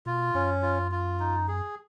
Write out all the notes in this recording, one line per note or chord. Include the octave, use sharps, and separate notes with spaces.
B2 F4
F#2 C#4
F4
F4
D#4
G#4